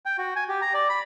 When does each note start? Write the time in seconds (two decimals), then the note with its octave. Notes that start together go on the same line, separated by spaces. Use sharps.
0.06 G5
0.18 F#4
0.36 G#5
0.49 G4
0.62 A#5
0.74 D5
0.89 B5